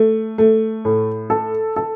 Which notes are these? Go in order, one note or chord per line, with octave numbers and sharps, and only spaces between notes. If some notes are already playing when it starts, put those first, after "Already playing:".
Already playing: A3
A3
A2
A4
A4